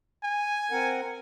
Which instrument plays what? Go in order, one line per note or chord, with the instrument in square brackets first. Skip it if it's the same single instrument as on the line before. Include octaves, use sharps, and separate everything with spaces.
[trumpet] G#5
[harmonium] C4 A#4 F#5